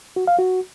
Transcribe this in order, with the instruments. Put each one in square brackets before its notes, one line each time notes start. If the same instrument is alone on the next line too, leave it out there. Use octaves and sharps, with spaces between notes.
[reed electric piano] F#4
F5
F#4